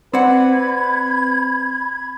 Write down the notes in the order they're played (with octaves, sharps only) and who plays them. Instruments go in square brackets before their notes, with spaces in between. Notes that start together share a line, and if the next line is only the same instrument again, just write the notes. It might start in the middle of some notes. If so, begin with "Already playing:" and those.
[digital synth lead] C4 [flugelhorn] B4 [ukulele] D5 F#5 [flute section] B5 G#6